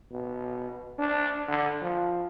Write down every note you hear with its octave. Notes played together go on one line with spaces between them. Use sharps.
B2
D4
D3
F3